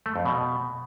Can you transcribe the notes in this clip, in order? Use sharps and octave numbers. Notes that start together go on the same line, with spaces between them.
A3
F2
B2